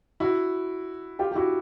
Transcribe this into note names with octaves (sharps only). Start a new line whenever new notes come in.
E4 F#4
F4 G4
G4
E4 F#4